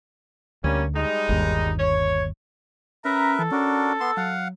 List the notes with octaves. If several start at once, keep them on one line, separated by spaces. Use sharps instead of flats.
D2 G3 A#3 C#4
G3 G#3 D#4
G1 D#2
C#5
C#4 A#4 B4 E5 A#5
E3 A4
C#4 D4 F#4 A#4
B3 C6 E6
F#3 F5 F#5